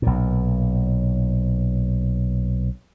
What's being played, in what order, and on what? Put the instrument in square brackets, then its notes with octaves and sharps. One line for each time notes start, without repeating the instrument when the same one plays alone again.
[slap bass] B1 A#2